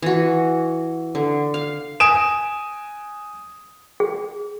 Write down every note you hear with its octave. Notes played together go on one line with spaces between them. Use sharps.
E3 F#4
D3
F5
G#5 D#6 D7 E7
G#4